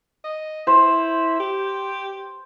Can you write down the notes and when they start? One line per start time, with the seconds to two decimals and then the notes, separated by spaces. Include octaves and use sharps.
0.24 D#5
0.67 E4 C5
1.40 G4